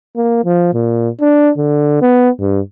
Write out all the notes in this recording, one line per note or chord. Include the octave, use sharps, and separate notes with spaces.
A#3
F3
A#2
D4
D3
B3
G2